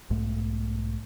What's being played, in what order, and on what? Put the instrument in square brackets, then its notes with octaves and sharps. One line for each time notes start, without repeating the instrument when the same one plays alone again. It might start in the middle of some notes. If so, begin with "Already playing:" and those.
[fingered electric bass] B1 G#2 A3